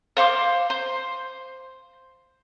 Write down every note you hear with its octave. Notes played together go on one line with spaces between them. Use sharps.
C5 F5 C6 D6
C5